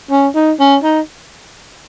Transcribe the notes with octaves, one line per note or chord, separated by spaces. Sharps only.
C#4
D#4
C#4
D#4